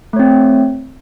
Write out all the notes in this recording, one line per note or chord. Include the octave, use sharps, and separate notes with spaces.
A3 C4 C#5